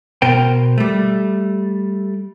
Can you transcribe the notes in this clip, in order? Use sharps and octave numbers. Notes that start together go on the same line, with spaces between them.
B2 A#4 C5 G5
G3 A3